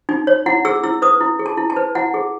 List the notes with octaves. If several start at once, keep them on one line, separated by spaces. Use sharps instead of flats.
D#4
C#5
E4 F#5
G#4 E6
E4 E6
B4 D#6
E4
G#4
A5
E4
A5
B4
E4 F#5
G#4